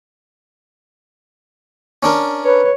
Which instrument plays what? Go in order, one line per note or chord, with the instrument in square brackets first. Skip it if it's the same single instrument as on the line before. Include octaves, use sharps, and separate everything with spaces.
[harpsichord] C#4 D4 A#4
[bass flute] B4 [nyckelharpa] C#5